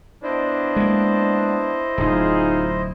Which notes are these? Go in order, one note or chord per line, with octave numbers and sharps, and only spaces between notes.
B3 D4 E4 C5 D#5
G#3 A#3
D1 F#2 D#4 F4 G#4